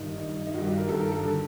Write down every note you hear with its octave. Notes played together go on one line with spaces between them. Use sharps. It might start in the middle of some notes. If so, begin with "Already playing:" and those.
Already playing: G2 D#3 D#4
G2 D#3
D#4
G2 D#3 F#4
G4
A#4
G2 D#3 A4
A#4
A4
D3